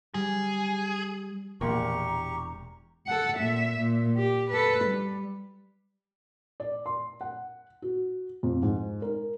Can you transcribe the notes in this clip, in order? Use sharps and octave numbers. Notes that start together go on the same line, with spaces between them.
G3 G#4
E1 A#1 A#2 G4 A#4 A#5 C#6
A4 F#5
A#2 E5
A#2
G4
A4 B4
G3
D5
C6
F#5
F#4
F2
G#2
A#4